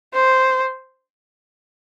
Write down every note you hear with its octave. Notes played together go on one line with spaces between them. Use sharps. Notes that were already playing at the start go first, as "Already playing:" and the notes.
C5